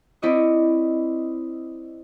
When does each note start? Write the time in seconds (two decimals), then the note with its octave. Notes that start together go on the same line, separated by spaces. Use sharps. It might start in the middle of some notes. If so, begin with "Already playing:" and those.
0.22 C4 E4 D5 D#5 C#6